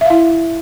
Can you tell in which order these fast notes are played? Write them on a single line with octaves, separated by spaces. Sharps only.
E5 F5 E4